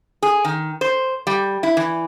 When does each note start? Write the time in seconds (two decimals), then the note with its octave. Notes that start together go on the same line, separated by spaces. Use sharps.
0.22 G#4
0.45 D#3
0.81 C5
1.27 G3
1.63 E4
1.77 E3